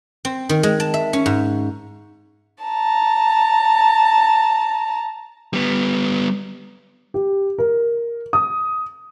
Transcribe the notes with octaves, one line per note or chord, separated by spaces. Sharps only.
C4
D#3
G#3
A5
E5
C#4
G#2
A5 A#5
G3 B3
G4
A#4
D#6